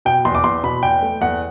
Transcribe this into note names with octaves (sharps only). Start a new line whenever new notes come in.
B2 G5
E2 C6
D6
E2 C6
B2 B5
E2 G5
A3
E2 F#5